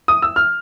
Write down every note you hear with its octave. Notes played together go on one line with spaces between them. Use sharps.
D#6
E6
F6